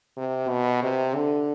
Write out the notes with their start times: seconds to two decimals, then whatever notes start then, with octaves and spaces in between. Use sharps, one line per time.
0.17 C3
0.50 B2
0.83 C3
1.15 D3